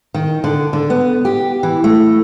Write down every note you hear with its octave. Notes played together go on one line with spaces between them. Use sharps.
D#3
D3
D3
B3
G4
E3
A3